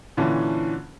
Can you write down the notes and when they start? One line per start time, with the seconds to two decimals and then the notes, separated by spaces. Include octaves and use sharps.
0.17 A#2 D3 E3 C#4 D4